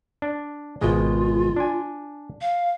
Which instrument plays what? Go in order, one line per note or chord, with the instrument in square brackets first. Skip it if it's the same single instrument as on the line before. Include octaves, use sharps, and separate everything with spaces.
[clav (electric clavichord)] D4
[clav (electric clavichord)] G#1 B2 G#3 [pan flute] F4
[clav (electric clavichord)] D4 G#5
[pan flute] F5